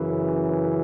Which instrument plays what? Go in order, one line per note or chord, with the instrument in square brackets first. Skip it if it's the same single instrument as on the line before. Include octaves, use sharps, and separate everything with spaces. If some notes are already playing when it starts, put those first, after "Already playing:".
Already playing: [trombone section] F#2 C#3 E3